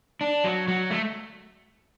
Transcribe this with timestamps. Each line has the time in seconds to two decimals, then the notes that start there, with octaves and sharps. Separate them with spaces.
0.21 D4
0.44 F#3
0.68 F#3
0.91 A3